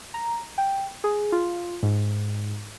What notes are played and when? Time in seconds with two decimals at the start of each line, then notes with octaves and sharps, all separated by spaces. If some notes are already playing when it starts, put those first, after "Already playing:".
0.14 A#5
0.58 G5
1.04 G#4
1.32 F4
1.83 G#2